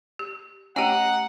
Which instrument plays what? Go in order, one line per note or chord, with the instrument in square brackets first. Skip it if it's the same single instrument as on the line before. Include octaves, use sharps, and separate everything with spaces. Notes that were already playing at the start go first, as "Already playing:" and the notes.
[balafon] G4
[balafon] A3 D#5 [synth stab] C#4 G4 [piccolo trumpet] F#5 [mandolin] A#5 D#6